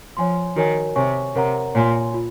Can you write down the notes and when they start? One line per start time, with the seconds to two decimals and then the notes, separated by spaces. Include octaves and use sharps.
0.17 F3 C#5 G#5 C6
0.56 D#3 F#4 A#4 C#5 G#5
0.96 C3 C#5 G#5 C#6
1.35 C3 A#4 C#5 F#5 A#5
1.75 A#2 C#5 G#5 C6
2.14 F4